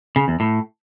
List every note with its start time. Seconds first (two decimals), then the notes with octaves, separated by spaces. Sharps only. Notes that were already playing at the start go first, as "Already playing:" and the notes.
0.16 C#3
0.28 E2
0.40 A2